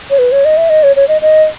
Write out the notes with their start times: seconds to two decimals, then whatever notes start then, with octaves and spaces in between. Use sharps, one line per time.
0.10 C#5
0.19 B4
0.32 C#5
0.45 D#5
0.57 E5
0.70 D#5
0.83 C#5
0.96 C#5
1.08 D#5
1.22 D#5